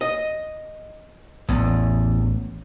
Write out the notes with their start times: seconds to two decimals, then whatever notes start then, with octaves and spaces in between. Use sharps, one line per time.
0.01 D#5
1.49 A1 E2